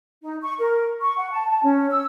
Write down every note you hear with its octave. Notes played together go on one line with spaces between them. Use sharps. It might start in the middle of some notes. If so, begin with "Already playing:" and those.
D#4
C#6
A#4
C#6
F#5
A5
A5
C#4
E6